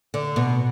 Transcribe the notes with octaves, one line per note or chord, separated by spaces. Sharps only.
D3
B2